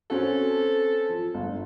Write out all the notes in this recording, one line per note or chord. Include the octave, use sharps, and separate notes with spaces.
C4 C#4 F#4 A4
F3
G1